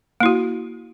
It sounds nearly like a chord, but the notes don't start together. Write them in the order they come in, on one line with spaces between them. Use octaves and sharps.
A#3 E4 F#4